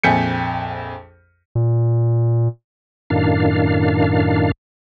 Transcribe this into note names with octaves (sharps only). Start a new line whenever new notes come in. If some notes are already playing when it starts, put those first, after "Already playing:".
A#1 F2 G#5 G6 B6 C#7
A#2
F#2 A2 D#3 D4 F5